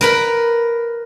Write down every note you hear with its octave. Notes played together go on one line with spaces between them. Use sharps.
A#4 B4 B5